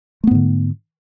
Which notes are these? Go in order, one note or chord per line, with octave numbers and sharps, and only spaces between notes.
G#2 D3 A3 B3